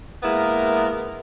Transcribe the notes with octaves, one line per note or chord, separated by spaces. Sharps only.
G#3 A#3 B3 E4 A#4